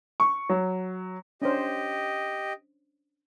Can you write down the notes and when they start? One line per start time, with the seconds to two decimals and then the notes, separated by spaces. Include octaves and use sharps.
0.20 C#6
0.49 F#3
1.42 C#4 D4 G4 C5 D#5